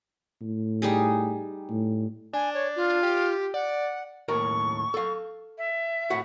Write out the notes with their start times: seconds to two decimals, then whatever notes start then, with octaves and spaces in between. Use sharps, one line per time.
0.41 A2
0.82 G3 D#4 G#4
1.70 A2
2.33 D4 G#5
2.54 C#5
2.76 F4
3.03 G4
3.54 D5 F#5
4.28 D#2 A2 A#4 C#6
4.94 A4 F5
5.57 E5
6.10 A2 F#4 F#5